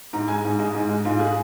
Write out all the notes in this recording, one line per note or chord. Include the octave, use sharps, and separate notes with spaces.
G#2 A#5
G#3 G#5
G#2
G#3 D#5
G#2
G#3
G#2 F4
G#3 G#4